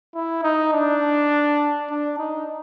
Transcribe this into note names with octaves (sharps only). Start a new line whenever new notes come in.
E4
D#4
D4
D4
D#4